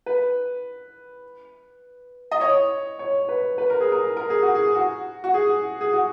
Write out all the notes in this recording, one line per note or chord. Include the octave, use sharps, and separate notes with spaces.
B4
D#5
C#5
C#5
B4
B4
A#4
G#4
A#4
A#4
G#4
F#4
G#4
F#4
F#4
G#4
G#4
F#4